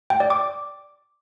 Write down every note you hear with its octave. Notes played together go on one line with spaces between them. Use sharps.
G5
D5
D6